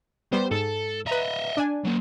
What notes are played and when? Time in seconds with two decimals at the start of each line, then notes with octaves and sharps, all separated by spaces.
0.32 G3 B3 C5
0.51 G#2 A4
1.07 B4 D#5 E5 A#5
1.57 D4 G#5
1.84 F#3 A#3